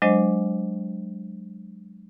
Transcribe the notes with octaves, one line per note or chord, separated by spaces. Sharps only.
F#3 G#3 D4 C5 D#5